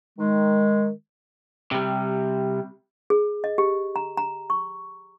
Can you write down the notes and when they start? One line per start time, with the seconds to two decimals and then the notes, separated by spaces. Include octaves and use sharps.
0.19 D#3 G#3
1.72 C3 G3
3.10 G#4
3.44 D#5
3.58 G4
3.96 A#5
4.17 A#5
4.50 C#6